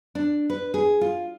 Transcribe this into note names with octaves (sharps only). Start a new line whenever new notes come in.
D4
B4
G#4
F4